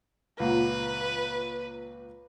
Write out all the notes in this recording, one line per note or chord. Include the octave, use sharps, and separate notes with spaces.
C#2 A#2 B4 F#5